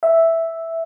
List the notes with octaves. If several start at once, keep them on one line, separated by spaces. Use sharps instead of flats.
E5